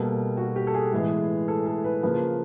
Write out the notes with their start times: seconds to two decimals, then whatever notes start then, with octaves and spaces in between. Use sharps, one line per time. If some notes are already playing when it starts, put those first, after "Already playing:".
Already playing: B2 G3 A#3 A4
0.37 F#4
0.56 G4
0.67 A4
0.74 G#4
0.93 A2 E3 G#3 B3
1.48 A4
1.66 A4
1.84 B4
2.03 C#3 F3 A#3 B4